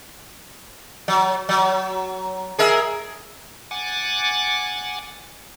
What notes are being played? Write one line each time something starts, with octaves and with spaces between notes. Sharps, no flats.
F#3
F#3
G#4 A#4 E5
F#5 G#5 D6 A6